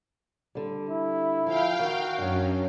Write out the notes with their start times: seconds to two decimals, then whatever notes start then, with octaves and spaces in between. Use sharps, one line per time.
0.55 D3 G3
0.90 E4
1.47 F3 F5 G5
1.79 D#3 F#4
2.18 F#2 F#3 D4